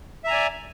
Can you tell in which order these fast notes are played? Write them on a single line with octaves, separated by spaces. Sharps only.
E5 A#5 G#5 D5